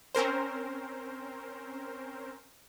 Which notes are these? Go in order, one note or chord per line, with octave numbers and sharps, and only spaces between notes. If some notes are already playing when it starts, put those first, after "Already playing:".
C4 C#4 A#4 C5